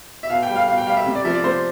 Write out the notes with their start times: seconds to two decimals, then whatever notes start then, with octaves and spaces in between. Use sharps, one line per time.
0.23 E5
0.30 B2 F5
0.43 G5
0.49 G3
0.56 F5
0.68 B2 F5
0.78 G5
0.87 G3 F5
0.97 E5
1.06 C3
1.15 D5
1.25 F3 E5
1.34 D5
1.44 C3 C5